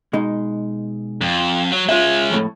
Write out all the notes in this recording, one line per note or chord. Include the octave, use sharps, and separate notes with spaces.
B2 G#3 D#4
F2
F#3
G#3 C#4 F4 E5
F2 A2